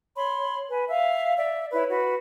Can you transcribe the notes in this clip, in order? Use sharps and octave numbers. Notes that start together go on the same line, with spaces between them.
C#5 B5 C6
B4 G#5
E5 F5
D5 E5
E4 B4 C#5
F#4 B4